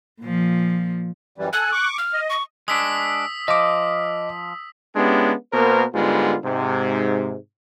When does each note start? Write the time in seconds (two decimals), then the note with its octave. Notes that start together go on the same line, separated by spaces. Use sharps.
0.21 A#2 F3
1.38 F#2 E3 G3
1.53 A4 G#5 F#6
1.72 C#6 D6
1.98 F6
2.13 D#5
2.30 C#6
2.68 G#3 D4 D#6 E6 B6
3.48 F3 D#5 D6
4.96 G#3 B3 C#4 D4 E4 G4
5.53 B2 A#3 B3 A#4 C5
5.94 G#2 D3 G3 G#3 B3 F4
6.45 G#2 C3